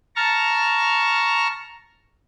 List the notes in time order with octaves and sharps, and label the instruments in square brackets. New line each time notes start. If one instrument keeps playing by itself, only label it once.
[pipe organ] A5 A#5 C#6 F6